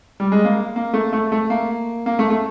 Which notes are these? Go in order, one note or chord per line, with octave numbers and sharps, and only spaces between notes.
G3
G#3
A#3
A#3
A3
A3
A3
A#3
A#3
A3
A3